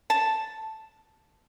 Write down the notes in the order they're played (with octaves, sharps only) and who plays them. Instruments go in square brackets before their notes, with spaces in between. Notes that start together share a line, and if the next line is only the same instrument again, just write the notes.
[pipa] A5